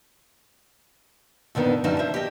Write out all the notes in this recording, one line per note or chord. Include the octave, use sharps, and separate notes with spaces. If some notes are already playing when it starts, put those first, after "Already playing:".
F2 D3 D#3 B3
F#2 D3 F3 G3 D#4 A5
C5 E5
G4 D#5